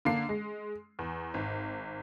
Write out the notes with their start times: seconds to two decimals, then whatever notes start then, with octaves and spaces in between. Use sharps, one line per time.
0.05 D3 A#3 D4 C7
0.29 G#3
0.99 E2
1.34 G#1